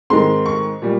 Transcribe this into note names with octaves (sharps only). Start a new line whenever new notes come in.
G#2 D#3 G#3 C4 C6
C#6
A#2 G3